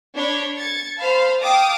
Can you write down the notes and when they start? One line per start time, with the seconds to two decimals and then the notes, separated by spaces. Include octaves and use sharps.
0.16 D4 C#5 B5
0.56 G#6 A6 C#7
0.98 C5 F5 A5 B5
1.40 F5 G5 A5 D6 D#6